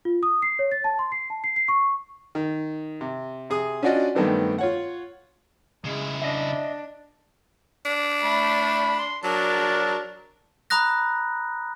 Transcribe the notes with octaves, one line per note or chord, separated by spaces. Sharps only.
F4
D#6
C7
C#5
A6
A5
C6
C7
A5
C7
C7
C#6
D#3
C3
C3 G#4 D#6
C#4 D4 F4 F#4 D5 D#5
G2 D#3 A3 B3 C4 D4
F4 C#5 F#5
C#3 G#3 E4
D4 D#5 E5
D4
A3 B5
C6
F#3 D4 A#4 A5
A#5 B5 D#6 F#6 A#6